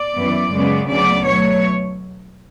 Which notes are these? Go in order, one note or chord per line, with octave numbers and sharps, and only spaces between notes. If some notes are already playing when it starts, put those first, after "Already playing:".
Already playing: D5
F#2 E3 B3
F#2 C#3 G#3 B3
D2 C#3 F#3 B3 D5
B2 F#3 A3 C#5